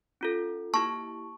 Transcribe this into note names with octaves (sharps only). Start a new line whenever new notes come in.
C#4 F4 A4
A#3 E4 G4 A5 C#6